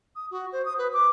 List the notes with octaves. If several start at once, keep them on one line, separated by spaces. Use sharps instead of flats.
D#6
F#4
C5
D#6
B4
D6